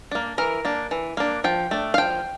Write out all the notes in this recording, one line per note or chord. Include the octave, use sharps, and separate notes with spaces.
A#3 D4
E3 A#4
A#3 D4
E3
A#3 D4
F3 G5
A3 D4
F5
F3 G5